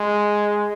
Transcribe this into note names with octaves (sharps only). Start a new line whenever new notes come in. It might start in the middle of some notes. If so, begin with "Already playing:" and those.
Already playing: G#3